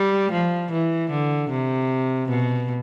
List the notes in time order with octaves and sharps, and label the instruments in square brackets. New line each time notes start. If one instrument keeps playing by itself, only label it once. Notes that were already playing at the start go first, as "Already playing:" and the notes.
Already playing: [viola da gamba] G3
F3
E3
D3
C3
B2